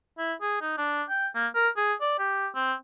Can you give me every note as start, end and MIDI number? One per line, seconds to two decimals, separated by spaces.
0.18 0.34 64
0.41 0.59 68
0.61 0.74 63
0.77 1.03 62
1.09 1.27 79
1.35 1.47 58
1.55 1.69 70
1.77 1.93 68
2.01 2.17 74
2.19 2.48 67
2.55 2.74 60